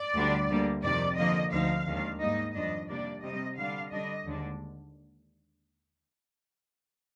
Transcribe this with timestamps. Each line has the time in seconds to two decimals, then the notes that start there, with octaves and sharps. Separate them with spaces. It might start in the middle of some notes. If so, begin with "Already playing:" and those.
Already playing: D5
0.14 D2 D3 G3 D4
0.49 D2 D3 G3 A#3
0.83 F2 C3 D#3 D5
1.18 D3 F3 A#3 D#5
1.52 D2 D3 F3 C4 D#4 F5
1.87 D#2 D#3 G#3 D4
2.20 G#2 G3 A#3 D#4 D#5
2.55 F2 D#3 G3 D4 D#5
2.89 C3 G3 A#3 D4 D5
3.23 C3 G3 C4 D#5
3.57 D3 G3 D4 F5
3.91 D3 G3 D4 D#5
4.26 D#2 D3 G#3 D4